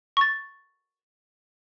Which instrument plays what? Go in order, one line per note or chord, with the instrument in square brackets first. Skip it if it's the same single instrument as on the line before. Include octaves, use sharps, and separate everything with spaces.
[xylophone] C#6 A6